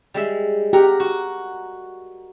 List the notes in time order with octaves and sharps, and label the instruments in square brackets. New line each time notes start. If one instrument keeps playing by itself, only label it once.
[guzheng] G3 G#3 E5
[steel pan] G4 [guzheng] A#4 F#5 A#5
[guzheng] F#4